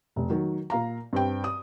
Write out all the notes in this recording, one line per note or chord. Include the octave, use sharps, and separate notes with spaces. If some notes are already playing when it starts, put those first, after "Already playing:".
F1
D#3 F#3
A#2 F5 A#5
G2 C4 G5
D#6